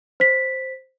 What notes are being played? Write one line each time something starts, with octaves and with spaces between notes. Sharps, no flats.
C5 B6